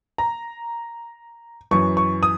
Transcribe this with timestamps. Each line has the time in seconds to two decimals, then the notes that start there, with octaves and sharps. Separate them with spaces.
0.18 A#5
1.71 F#2 E3 C#6
1.97 C#6
2.23 D#6